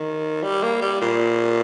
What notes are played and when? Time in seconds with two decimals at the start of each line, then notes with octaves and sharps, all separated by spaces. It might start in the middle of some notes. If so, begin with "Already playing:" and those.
Already playing: D#3
0.43 G3
0.63 A#3
0.81 G3
1.01 A#2